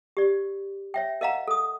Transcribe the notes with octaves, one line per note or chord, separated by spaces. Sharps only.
G4 D5
C#5 E5 G5
A#4 D#5 F5 F#5 A#5
A4 D#6